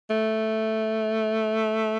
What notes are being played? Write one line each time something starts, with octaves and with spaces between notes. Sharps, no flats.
A3